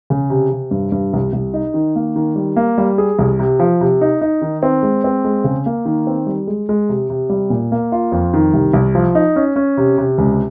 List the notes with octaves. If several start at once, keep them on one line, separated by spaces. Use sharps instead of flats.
C#3
C3
C3
G2
G2
C2
C2
D#4
D#3
A#3
D#3
G3
A#3
G3
G#4
C2
C3
F3
C3
D#4
D#4
D#3
C4
G#3
C4
G#3
C#3
A#3
D#3
C4
G3
G#3
G#3
C3
C3
G3
A#2
A#3
F4
F2
D#3
C2
C2
F3
D#4
C#4
C#4
C3
C3
C#2